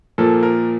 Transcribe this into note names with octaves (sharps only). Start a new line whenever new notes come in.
A#2 F3 A#3 A4
A#4